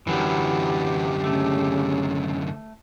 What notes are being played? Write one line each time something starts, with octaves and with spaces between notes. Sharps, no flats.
F#2 D3 E3 F#3 G3 G4
C#3 A3